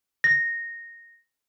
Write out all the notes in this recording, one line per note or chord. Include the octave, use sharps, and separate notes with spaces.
A#6